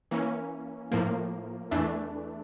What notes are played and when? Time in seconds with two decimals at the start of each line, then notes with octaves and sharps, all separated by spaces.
0.11 E3 A#3 C#4
0.92 A2 F3 A#3
1.71 E2 E3 A3 D4